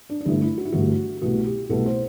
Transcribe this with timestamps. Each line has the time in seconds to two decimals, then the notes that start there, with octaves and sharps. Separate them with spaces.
0.10 D4
0.20 D4
0.25 G1 G2 D3 A3 E4
0.41 E4
0.58 F#4
0.65 E4
0.72 G1 G2 D3 A3 F#4
1.22 C2 B2 A3 F#4
1.46 G4
1.69 C2 B2 A3 A4
1.86 C5